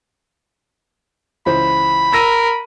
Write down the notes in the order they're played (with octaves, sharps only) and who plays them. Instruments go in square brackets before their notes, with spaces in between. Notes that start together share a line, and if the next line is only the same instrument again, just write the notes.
[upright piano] C#2 E3 C5 [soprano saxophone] B5
[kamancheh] A#4 [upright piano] E6 A#6 D#7